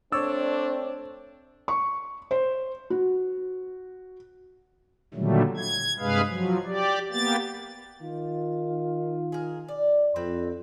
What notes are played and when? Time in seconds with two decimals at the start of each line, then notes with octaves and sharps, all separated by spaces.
0.12 A3 C4 D4 C#5 D5 E6
1.68 C#6
2.31 C5
2.90 F#4
5.14 A#2 D3 D#3 F#3 G3 A3
5.57 G#6
5.99 G2 C3 G#3 G#4 B4 F5
6.29 F3 F#3
6.66 G4 D5
7.11 A#3 B3 G4 A6
8.03 D#3 F4
9.32 G#4 A#4
9.68 D5
10.16 F2 C4 B4